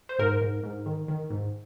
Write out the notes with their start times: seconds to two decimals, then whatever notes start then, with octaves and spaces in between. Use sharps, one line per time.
0.09 C5
0.19 G#2 A#4
0.42 G#2
0.63 G#2
0.86 D#3
1.08 D#3
1.30 G#2